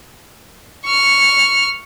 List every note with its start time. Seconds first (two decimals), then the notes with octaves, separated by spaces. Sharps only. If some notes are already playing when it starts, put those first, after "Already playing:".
0.85 C#6 F6